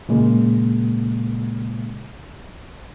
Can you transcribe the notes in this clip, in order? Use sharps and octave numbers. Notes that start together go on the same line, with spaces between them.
A#2 C#3 G#3 A#3